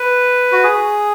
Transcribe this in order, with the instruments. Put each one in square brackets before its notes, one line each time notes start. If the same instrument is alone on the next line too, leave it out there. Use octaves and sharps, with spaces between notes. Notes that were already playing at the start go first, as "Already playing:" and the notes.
Already playing: [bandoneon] B4
F#4
G#4